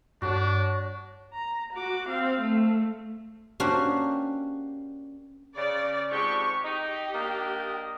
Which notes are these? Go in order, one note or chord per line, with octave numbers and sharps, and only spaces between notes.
G2 D4 F#4 C#5 F#5
A#5
F#4 D6
C4 F5
A3
A#3 C#4 D4 F#4 G4 C5
C#3 D5
F2 G#2 G4 C#6
D#4 G4
A#3 D4 D#5